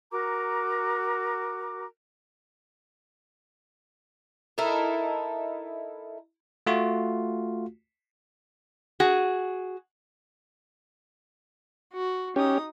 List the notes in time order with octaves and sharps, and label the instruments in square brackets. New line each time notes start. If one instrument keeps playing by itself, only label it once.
[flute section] F#4 A#4 A#5 D6
[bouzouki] D#4 E4 A4 A#4
[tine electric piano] A3 F4 F#4
[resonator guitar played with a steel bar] F#4 G#4
[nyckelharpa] F#4
[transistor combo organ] C#4 G4 [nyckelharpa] D#4 D#6